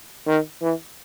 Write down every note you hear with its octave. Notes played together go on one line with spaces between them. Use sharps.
D#3
E3